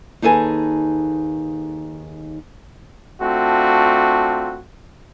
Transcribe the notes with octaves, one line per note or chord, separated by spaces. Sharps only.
D#2 D#4 G#4 A4 B4 G#5
A3 C4 D4 F4 F#4